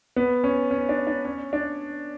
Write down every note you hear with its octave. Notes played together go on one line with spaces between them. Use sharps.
B3
C#4
C#4
D4
D4
C#4
D4